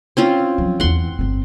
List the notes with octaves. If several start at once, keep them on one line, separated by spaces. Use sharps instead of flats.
C4 C#4 F4
F3 F#3
E2 E3 F#5 C6
G1 C4